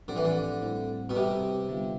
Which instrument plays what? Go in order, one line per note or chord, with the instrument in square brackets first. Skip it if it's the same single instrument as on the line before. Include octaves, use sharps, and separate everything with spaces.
[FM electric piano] A2 F3 C4 G4 [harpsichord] D3
[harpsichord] E3
D3
[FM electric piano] A2 G3 C4 E4
[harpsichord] B2
[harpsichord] C3 [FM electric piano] G3 C4 G4 B4
[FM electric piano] D3 G3 B3 F4